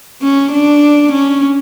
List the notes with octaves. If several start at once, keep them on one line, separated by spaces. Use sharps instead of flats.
C#4
D4
C#4